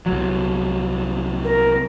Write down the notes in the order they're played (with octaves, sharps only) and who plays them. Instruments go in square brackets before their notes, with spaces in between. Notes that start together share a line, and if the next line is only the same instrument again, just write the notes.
[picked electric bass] C2 F#3
[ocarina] A#4